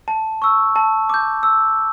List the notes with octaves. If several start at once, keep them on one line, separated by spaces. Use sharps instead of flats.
A5
C#6 E6
A5
D6 G6
E6